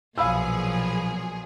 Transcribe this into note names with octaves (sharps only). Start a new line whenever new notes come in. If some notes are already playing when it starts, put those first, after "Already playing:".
B1 A#2 F3 F#3 G#4 F5 B5 E6